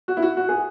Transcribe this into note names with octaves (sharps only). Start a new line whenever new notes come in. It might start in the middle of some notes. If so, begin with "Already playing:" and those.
F#4
E4
F#4
F#4
G#4